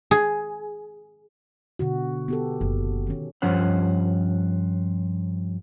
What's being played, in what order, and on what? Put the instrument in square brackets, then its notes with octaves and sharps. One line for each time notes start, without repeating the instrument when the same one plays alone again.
[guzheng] G#4
[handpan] B2 D3 F#4
B3 G4 A4
[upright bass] F#1
[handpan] D#3 C#4
[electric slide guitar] G2 F3 C#4 C5 F#5